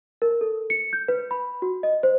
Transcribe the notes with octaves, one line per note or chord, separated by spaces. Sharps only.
A#4
A4
C#7
G6
B4
B5
F#4
D#5
C5